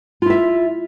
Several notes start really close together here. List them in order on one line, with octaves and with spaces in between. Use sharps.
F4 E4 E5